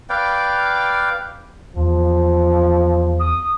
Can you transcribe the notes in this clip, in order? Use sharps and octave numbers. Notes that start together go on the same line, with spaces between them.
B4 D5 F5 G5
E2 F3
D#6